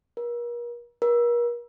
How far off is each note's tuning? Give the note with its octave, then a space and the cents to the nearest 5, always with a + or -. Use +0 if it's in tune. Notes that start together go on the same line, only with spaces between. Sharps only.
A#4 +40
A#4 +40